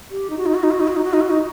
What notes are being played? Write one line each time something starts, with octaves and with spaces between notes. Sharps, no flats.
G4
D#4
F#4
D#4
F#4
D#4
F#4
D#4
F#4
D#4
F#4
D#4
F#4
D#4